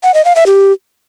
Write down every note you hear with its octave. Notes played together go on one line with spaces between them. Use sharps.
F#5
D#5
F5
E5
G4